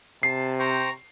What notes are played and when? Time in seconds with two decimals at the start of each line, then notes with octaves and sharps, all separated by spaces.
0.23 C3 A5 C7
0.59 C5 G5 A#5 C#6